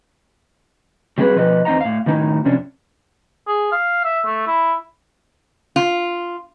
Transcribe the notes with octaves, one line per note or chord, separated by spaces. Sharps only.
F#3 G3 C4 G#4 B4
B2 F3 B4 D#5
E2 C4 D#4 D#5 F#5 A#5
A2 F5
A2 D#3 F#3 D#4 E4
F2 C3 C#4 D4
G#4
F5
E5
A3
E4
F4